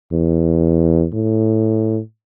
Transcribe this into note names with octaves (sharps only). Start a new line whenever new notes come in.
E2
A2